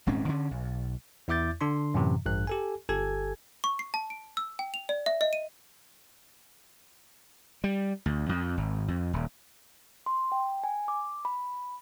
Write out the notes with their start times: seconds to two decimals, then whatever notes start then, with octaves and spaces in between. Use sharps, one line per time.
0.07 D#1 G#2 C4 C#4
0.29 D3 C#4
0.51 B1
1.28 E2 E4 E5 D6 G6 A6
1.61 D3 D4 C6
1.94 F#2 A2 C3 E3
2.26 A1 G2 F#6
2.47 G4 A4 G#5
2.89 G1 G4 A4 G#5 G#6
3.64 C#6
3.79 C7
3.94 A5
4.10 D7
4.37 E6
4.59 G5
4.74 F7
4.89 D5
5.06 E5
5.21 D#5
5.33 D#7
7.64 G3
8.06 D2
8.29 F2
8.57 G#1
8.88 F2
9.13 D#1
10.06 C6
10.32 G5
10.64 G#5
10.88 D6
11.25 B5